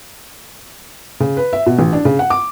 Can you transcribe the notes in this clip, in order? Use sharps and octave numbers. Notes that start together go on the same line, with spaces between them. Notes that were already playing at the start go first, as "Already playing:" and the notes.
C#3
B4
E5
B2
A1
D4
C#3
F#5
D6